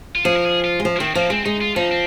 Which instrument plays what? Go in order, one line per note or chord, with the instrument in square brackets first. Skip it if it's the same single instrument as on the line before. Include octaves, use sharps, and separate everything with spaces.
[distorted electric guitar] F4
[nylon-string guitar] F3 [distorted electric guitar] G#4
[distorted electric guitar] A#4
G#4
F4
[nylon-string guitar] G#3
F3
[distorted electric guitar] A#3
[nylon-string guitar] D#3 [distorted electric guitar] C4
[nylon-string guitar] F3 [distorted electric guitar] A#3
[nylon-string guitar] G#3 [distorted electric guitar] C4
[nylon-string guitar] G#3 [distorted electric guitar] D#4
[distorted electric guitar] F4
[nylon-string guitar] F3 [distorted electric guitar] D#4
[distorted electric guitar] C4